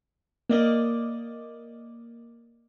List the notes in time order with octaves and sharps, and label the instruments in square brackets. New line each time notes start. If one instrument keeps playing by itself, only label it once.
[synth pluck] A#3 D5 D#5